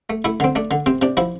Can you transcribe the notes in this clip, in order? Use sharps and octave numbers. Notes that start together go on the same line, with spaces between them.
A3
A3 E4
D3 C4
A3 D4
D3
C3 C4
C3 D4
F3 E4